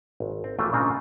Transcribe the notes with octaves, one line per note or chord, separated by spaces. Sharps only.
G#1
C4
G#1 E3 A3 A#3 F4 G5
A#2 C#3 C4 D4 D#4 F4